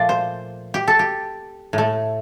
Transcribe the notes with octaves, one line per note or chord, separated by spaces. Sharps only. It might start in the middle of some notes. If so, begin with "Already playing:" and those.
Already playing: A#2 F3 A3 D5 F5
C5
G4
A4
G4
A2 A3